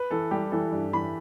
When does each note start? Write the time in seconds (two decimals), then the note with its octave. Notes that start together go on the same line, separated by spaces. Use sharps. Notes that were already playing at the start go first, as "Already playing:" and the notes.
Already playing: B4
0.11 E3 A4
0.31 G3 G4
0.52 E3 A4
0.72 G2
0.93 E3 B5